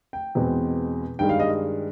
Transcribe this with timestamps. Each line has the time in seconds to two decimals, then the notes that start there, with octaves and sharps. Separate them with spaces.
0.13 G5
0.35 E2 B2 G#3 C4
1.19 G2 D#3 G#3 G5
1.29 F5
1.40 D#5